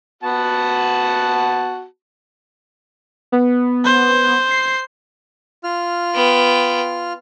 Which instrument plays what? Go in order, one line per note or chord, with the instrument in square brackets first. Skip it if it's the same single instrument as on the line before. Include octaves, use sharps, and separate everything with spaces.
[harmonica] B3 F#4 A5
[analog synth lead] B3
[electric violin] C5
[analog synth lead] C7
[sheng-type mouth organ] F4 F6
[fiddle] B3 G5